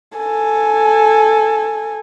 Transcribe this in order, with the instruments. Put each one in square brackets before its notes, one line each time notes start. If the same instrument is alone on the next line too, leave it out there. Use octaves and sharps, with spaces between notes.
[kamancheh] A4 G#5